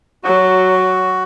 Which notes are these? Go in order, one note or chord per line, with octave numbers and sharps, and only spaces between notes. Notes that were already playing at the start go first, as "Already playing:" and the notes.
F#3 F#4